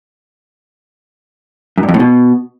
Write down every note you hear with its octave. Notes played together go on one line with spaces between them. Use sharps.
F#2
G2
F2
A2
B2